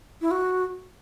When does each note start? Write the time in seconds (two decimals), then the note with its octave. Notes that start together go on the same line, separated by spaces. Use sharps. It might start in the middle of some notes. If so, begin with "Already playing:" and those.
0.21 E4
0.31 F#4